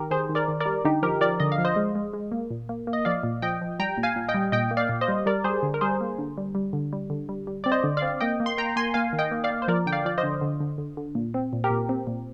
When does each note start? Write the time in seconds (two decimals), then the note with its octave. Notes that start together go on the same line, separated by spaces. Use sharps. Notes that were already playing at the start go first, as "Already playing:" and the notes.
Already playing: D#3 G4 A#4
0.11 D#3 G#4 C5
0.29 D#3
0.35 A#4 D5
0.48 D#3
0.60 A#4 D5
0.66 G3
0.85 D3 D#4 G4
1.03 F3 G4 A#4
1.21 F3 A#4 D5
1.40 D3 D#5
1.52 F5
1.58 F3
1.65 C5 D#5
1.76 G#3
1.95 G#3
2.13 G#3
2.32 A#3
2.51 A#2
2.69 A#3
2.87 A#3
2.93 D#5
3.05 F3 D5 F5
3.23 A#2
3.42 F3 D#5 G5
3.61 F3
3.79 G3 G5 A#5
3.98 A#2
4.03 F5 G#5
4.16 A#2
4.29 D#5 G5
4.34 G3
4.52 A#2 D#5 G5
4.71 A#3
4.77 D5 F5
4.89 A#2
5.01 C5 D#5
5.08 G3
5.26 G3 A#4 D5
5.44 G3 G#4 C5
5.63 D3
5.74 A#4
5.81 G3 G#4 C5
6.01 A#3
6.19 D3
6.38 G3
6.55 G3
6.73 D3
6.93 G3
7.10 D3
7.29 G3
7.47 G3
7.64 C4 D5
7.72 C5 D#5
7.84 D3
7.97 D5 F5
8.02 C4
8.21 A#3 D#5 G5
8.40 A#3
8.46 C6
8.58 A#3 G5 A#5
8.76 A#3 G#5 C6
8.94 A#3 F5 G#5
9.13 D#3
9.19 D#5 G5
9.31 A#3
9.44 D5 F5
9.50 A#3
9.62 C5
9.68 F3 A#4 D5
9.86 D3 G5
9.92 D5 F5
10.05 F3 D5
10.18 C5 D#5
10.23 D3
10.41 D3
10.60 D3
10.78 D3
10.97 D3
11.15 A#2
11.34 C4
11.53 A#2
11.64 G4 A#4
11.70 A#2
11.89 C4
12.07 A#2